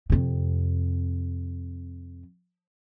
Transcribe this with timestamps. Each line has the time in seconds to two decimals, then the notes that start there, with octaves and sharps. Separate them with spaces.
0.10 F2 C3